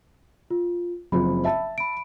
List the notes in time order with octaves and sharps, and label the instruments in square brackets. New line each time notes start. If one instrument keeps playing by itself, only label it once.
[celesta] F4
[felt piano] F#1 F3 C4 [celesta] B5
[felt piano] E5 A5
[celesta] B5 D7